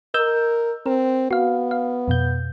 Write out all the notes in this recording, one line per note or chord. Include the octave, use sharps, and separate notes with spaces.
A#4 D#5 E6 G6
C4 A#4
B3 F#4 F5
F5
F2 B2 G6